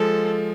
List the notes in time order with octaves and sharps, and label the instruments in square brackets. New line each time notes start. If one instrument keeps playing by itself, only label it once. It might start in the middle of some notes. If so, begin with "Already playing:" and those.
Already playing: [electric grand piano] F3 G#3 [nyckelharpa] A4